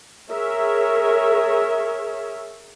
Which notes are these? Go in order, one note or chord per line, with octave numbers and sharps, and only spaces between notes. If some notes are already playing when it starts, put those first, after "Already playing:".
G#4 A#4 C#5 E5